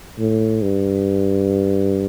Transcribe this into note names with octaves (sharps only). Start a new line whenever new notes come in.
A2
G2